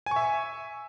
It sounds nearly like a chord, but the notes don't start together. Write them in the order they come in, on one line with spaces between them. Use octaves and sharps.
G#5 C#6 E5